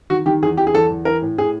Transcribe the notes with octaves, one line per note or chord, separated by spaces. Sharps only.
D#3 F#4
D#3 G4
E2 G#4
E3 G4
G#4
E2 A4
E2
E3 A#4
A2
A2 G#4